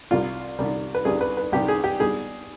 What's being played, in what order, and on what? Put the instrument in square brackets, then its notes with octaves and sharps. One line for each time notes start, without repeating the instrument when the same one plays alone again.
[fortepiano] C2 C3 G3 F4
C2 C3 G3
B4
C2 C3 G3 G#4
B4
B4
C2 C3 G3 G4
G#4
G4
B2 G3 D4 G#4